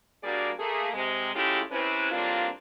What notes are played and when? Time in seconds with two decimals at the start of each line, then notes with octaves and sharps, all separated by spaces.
0.23 G3 A#3 D4 F#4 G#4 D5
0.59 A3 A#3 G#4
0.93 C3 G#3
1.34 G#3 A3 C#4 E4 F4 G4
1.71 C3 C4 C#4 E4 B4
2.11 A2 G3 A#3 C4 D4 F4